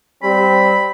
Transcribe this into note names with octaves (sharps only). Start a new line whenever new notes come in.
G3 C4 B5